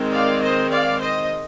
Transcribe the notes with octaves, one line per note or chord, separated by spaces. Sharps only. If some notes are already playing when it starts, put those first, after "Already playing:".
Already playing: D#3 G#3 C4
D5 F5
C5 D#5
D5 F5
C5 D#5